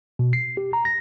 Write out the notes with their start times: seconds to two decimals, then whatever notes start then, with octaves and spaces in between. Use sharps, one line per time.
0.19 B2
0.33 C7
0.57 G4
0.73 A#5
0.85 A#6